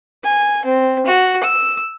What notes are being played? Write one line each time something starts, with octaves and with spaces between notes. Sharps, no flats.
G#5
C4
F#4
E6